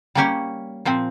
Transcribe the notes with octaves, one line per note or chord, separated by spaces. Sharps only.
G3 A#3 C#4 G4 C#5
A#2 F3 C4